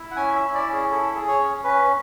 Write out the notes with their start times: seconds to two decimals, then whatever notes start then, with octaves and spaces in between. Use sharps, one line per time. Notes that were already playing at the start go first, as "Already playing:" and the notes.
Already playing: E4
0.11 F#5
0.16 C#4 G#5
0.35 E5
0.41 E4
0.54 D5
0.67 C#4
0.73 G#4
0.90 E4 A4
1.15 G#4
1.28 C#5
1.39 C#4
1.64 C#4 B4